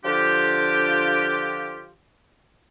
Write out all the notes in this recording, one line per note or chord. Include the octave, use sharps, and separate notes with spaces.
D3 F3 D4 F4 G4